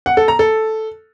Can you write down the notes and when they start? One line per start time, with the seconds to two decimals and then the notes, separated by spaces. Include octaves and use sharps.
0.06 F#5
0.17 A4
0.28 A#5
0.39 A4